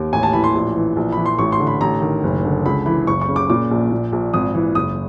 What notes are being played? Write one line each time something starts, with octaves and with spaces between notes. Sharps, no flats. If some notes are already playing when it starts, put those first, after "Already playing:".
Already playing: D#2
A1 G#5
A5
E3 B5
C6
A#1
E3
A#1
E3 B5
C6
A1 C#6
C6
D3
B5
A1 A#5
D#3
F#1
D3
C#2 B5
E3 B5
F#1 C#6
C#6
C#3
D6
A#2 D6
A#1
A#2
A#1
G#1 D#6
E3
F#1 D#6